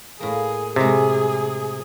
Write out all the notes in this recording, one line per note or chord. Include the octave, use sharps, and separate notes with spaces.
A2 A#3 G#4
A2 C3 G#3 G#4